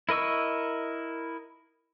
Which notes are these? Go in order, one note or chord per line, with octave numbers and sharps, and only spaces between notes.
E4 A#4 D#5 C#6 E6